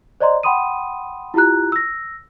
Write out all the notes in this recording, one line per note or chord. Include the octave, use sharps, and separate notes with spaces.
C5 D5 D#5 A#5 C6
F#5 G5 B5 C6 D#6 D#7
E4 F4 G4 A#5 F#6
E6 A#6